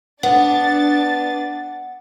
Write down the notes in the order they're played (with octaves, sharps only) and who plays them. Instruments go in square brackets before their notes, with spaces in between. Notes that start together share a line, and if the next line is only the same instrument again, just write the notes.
[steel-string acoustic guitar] B3 [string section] D4 A6 [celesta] F#5